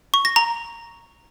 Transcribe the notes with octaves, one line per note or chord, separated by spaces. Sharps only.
C#6
A#6
A#5